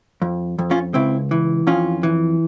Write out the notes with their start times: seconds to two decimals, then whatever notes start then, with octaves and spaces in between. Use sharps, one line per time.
0.22 F2
0.59 F2
0.71 C#4 F4
0.94 C#2 C4 E4
1.31 E3
1.67 F2 C#4 F4
2.03 E3